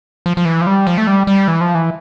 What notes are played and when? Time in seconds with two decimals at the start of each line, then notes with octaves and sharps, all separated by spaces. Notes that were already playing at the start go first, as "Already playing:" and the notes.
0.26 F3
0.37 F3
0.45 E3
0.61 F3
0.67 G3
0.87 F3
0.98 A3
1.07 G3
1.27 G3
1.48 E3
1.61 F3
1.75 E3